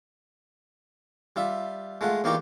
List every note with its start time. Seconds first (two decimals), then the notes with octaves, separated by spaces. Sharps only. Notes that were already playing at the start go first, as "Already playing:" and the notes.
1.36 G3 F4 E5
2.01 G#3 A3 F4 F#5
2.24 E2 A#3 D#4 F4 G4 C#6